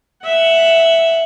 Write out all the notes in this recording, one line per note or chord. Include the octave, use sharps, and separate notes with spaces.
E5 F#5